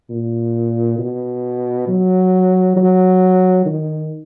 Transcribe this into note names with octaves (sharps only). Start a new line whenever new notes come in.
A#2
B2
F#3
F#3
D#3